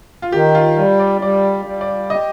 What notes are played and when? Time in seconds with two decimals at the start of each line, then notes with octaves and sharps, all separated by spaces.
0.22 F4
0.32 D#3 G4
0.55 F4
0.77 G3 F4
1.00 D5
1.21 G3 D5
1.66 G3
1.81 D5
2.10 G4 D#5